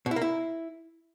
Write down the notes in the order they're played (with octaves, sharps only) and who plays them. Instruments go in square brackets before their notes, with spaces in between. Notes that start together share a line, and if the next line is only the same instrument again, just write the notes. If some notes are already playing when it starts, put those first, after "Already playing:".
[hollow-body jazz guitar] B2
E4
A#3
E4